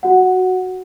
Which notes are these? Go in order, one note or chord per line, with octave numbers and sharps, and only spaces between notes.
F#4 F#5